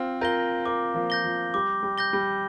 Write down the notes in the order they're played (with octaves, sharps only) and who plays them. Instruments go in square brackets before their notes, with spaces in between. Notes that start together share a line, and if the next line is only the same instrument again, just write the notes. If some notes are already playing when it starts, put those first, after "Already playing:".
Already playing: [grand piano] C4 F4
[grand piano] F4 A#4 [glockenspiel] G6 A#6 G7
[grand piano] F4 A#4 [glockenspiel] D6
[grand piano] F3 A#3
[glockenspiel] G6 A#6 G7
[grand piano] F3
[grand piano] G3 [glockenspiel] D6
[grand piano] G3
[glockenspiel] G6 A#6 G7
[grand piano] G3